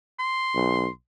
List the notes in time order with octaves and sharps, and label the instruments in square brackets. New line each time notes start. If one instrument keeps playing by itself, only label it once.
[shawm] C6
[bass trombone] B1